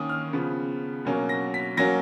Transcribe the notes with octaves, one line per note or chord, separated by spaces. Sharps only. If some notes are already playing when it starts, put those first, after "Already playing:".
Already playing: D#3 A#3 C#4 D#6
F6
C#3 F3 B3
B2 F#3 A#3 C#4
A#6
B6
F#3 A#3 C#4 A#6